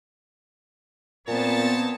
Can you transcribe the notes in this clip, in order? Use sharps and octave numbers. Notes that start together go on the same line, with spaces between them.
A#2 B3 C4 D#4 C#5 A5